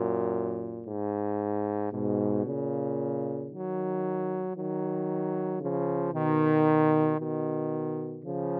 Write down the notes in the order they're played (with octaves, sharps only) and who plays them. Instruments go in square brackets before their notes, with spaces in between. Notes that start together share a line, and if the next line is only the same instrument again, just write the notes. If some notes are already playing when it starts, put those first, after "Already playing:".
Already playing: [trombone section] F#2 A#2
G#2
G#2 B2
A#2 C#3
D#3 F#3
D#3 F#3
C#3 F3
B2 D#3
B2 D#3
C#3 F3